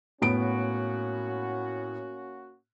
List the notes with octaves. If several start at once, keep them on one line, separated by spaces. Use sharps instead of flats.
A2 A#3 B3 C#4 F#4 D7